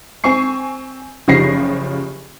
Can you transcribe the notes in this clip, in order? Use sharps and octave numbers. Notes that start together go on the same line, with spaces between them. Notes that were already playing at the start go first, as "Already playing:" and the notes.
C4 G#5 C#6 C7
F#1 C#3 F3 G4 A#6 C7